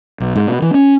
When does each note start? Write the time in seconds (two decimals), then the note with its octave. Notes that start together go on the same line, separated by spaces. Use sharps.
0.20 B1
0.36 G#2
0.48 B2
0.62 E3
0.74 C#4